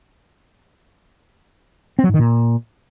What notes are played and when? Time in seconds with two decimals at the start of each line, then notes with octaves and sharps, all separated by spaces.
1.99 C4
2.04 F#3
2.09 G#2
2.14 D#3
2.19 A#2